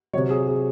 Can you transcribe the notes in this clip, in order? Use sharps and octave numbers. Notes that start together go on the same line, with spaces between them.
C3 F#3 C#5
G#4
G#4